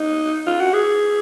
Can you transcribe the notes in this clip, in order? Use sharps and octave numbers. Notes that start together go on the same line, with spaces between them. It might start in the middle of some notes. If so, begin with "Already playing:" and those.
Already playing: D#4
F4
F#4
G#4